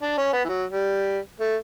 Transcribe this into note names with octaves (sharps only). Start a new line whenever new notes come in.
D4
C#4
B3
E3
F#3
G3
A3